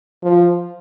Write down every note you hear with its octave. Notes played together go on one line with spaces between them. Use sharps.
F3